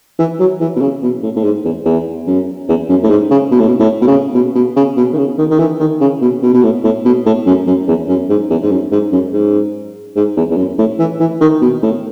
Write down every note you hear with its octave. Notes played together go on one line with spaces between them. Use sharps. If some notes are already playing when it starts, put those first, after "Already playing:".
E3
F#3
E3
B2
C#3
B2
A2
A2
G#2
E2
E2
F#2
E2
F#2
A2
G#2
C#3
B2
A2
B2
A2
B2
C#3
B2
B2
C#3
B2
D#3
C#3
D#3
D#3
E3
D#3
C#3
B2
B2
B2
A2
A2
B2
A2
F#2
F#2
E2
F#2
G#2
E2
G#2
F#2
G#2
F#2
G#2
G#2
E2
E2
F#2
A2
E3
E3
D#3
B2
A2